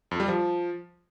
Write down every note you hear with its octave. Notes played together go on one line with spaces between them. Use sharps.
F2
G3
F3